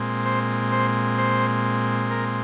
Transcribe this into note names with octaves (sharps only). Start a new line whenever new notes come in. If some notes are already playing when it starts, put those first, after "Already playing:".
Already playing: A#2 G#3 C4
C5
C5
C5
A#4